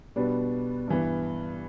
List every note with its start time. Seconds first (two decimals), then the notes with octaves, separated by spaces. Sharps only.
0.16 B2 G3 B3 D4
0.88 G2 E3 B3